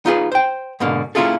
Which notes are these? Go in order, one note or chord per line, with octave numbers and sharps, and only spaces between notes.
D#4 F4 G#4 B4
C5 G5
G#2 B2 D3 A#3
A#3 C#4 E4 F4 G#4 A4